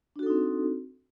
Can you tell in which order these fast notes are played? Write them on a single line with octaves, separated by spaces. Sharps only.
D4 F#4 A4 D#4 C4